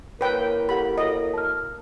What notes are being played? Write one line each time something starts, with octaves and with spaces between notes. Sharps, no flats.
A#3 E4 A#4 B4 C#5 G5
G4 A4 F#5 B5
F#4 A4 C#5 D#5
A5 F6